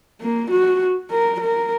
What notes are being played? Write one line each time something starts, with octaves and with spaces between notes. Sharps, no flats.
A#3
F#4
A#4
A#4